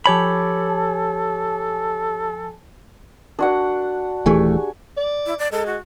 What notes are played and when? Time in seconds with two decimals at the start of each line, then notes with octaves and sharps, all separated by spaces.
0.06 F3 G4 A4 C#5 G#5 A5 B5
3.39 D4 F#4 A#4 D5 F#5
4.26 D#1 E3 A3 D4 G4 G#4 G#5
4.97 D5
5.26 E4
5.39 D5
5.52 G#3 A4
5.66 F#4